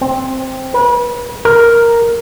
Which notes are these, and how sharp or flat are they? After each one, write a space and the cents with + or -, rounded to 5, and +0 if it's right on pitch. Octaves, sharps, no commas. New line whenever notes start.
C4 +5
B4 -35
A#4 +0